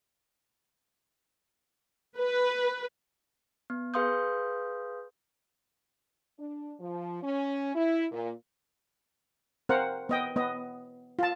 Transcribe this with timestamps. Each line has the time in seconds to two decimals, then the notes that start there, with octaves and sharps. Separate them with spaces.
2.18 B4
3.70 B3
3.94 G#4 B4 F5 C6 D#6 G6
6.38 D4
6.80 F3
7.22 C#4
7.75 E4
8.12 A#2
9.69 C4 A#4 C5 F5 F#5
10.09 B3 D#5 G5
10.36 B3 D#5
11.19 F4 A5